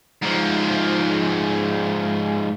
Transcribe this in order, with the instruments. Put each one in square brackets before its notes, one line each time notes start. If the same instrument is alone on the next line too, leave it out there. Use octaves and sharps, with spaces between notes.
[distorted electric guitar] G#2 F3